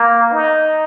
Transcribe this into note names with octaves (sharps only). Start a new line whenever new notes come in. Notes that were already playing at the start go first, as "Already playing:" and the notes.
Already playing: A#3
D#4